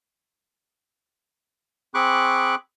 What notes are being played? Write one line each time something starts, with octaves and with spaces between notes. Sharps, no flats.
C4 G#4 B5 C#6 D6 F#6